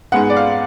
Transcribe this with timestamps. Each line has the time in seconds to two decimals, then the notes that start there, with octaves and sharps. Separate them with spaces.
0.12 G#2 G#3 B3 F#5
0.30 D5
0.36 F5